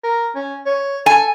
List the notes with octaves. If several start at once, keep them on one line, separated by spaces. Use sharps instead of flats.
A#4
C#4
C#5
A4 G#5